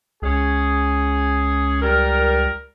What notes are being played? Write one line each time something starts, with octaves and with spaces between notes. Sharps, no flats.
C#2 C#4 G#4
G3 A#4